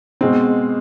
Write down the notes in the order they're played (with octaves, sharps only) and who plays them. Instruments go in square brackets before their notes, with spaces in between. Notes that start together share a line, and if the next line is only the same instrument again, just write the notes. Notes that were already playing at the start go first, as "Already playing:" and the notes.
[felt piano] B2 G#3 C4